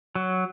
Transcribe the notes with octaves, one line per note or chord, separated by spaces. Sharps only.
F#3